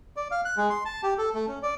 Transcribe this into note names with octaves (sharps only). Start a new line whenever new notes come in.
D5
F5
F#6
G#3
C6
A5
G4
A4
A3
C#4
D5